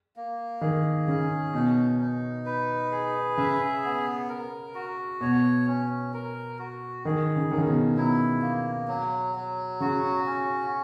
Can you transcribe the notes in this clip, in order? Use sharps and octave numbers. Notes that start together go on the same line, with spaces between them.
A#3
D#3 G#4
C#3 C#4
B2 D#4
D#4
B4
G#4
C#3 E5
B3
A#4
F#4
B2 C#5
C#4
A#4
F#4
D#3 G#4
C#3
D#3 F#3
C#3
B2
B2 E4
A#3
F#3
F#3
C#3 F#4
C#4